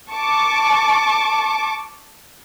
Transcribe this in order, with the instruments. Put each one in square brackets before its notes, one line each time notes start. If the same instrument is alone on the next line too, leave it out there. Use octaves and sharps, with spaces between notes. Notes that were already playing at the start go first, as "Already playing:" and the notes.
[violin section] A5 C#6 D6